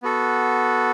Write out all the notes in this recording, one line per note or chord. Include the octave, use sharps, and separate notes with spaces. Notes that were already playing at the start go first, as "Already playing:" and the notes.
B3 F#4 A4